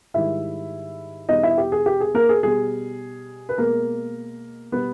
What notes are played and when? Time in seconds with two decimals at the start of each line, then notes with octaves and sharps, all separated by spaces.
0.14 G#2 D#3 G3 E4 E5
1.29 E2 B2 G3 D#4 D#5
1.43 E4 E5
1.58 G4
1.72 G#4
1.86 G4
2.00 G#4
2.14 A#3 A#4
2.29 G#4
2.43 B2 G3 G#4
3.49 B4
3.58 B2 G#3 A#3 A#4
4.72 B2 G3 B3 B4